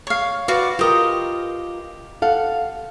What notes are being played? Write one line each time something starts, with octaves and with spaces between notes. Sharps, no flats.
C#5 F5
F#4 B4 D5 F5
F4 G4 A#4 D#5 G5
A4 F5 F#5